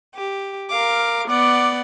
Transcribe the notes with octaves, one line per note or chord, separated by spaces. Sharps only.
G4
A#4 F5 D6
B3 D5 F#5 D6